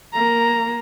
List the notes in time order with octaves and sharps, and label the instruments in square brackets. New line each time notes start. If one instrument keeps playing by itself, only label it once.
[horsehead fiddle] A#3 A#5